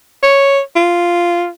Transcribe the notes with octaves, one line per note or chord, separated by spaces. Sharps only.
C#5
F4